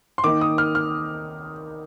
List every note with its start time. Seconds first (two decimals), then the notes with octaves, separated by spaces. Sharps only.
0.18 C6
0.24 D#3 A#3 D#4 D6
0.41 D#6
0.58 F6
0.75 F6